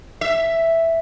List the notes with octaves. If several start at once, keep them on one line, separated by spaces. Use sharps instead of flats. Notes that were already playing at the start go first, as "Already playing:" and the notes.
E5